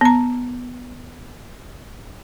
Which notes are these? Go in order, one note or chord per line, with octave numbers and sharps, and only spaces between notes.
B3 A#5